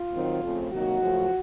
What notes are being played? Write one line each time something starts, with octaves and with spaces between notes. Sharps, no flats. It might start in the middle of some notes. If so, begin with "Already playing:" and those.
Already playing: F4
D#3 F#3 C4
F2 C#3 F3 A3 C4
C3 D#3 F#3 A#3 D#4 F#4
F#2 C#3 F3 A3